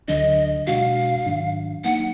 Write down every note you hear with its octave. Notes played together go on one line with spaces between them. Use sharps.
D2 D3 F#3 D4 D#5
B2 G#3 D4 F#4 F5
G#2 D#3 F#3 D4
F#3 A#3 D#4 F#5